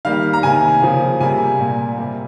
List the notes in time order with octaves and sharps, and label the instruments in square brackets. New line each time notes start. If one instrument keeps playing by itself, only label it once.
[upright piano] D#3 G3 A#3 F5
A#5
C3 D#3 A#3 G#5
C#3 F3 A#3
C3 G3 A#3 G#5
A#2 G3 A#3
C3 G3 A#3